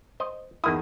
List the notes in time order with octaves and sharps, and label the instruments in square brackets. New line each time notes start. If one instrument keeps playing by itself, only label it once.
[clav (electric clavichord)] C5 D#5
[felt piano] E2 D#4 D#6 [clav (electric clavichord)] D#3 A#3 E4